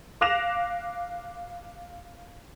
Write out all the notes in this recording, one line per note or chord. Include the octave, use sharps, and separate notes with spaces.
F5 D6 F#6 A#6 E7 F7